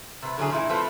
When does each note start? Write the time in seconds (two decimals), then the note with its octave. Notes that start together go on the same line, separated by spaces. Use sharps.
0.22 C3 B4
0.38 D3 F#3 C#4 E4 G#4
0.51 A#2 E3 E4
0.69 F3 A3 C4 B4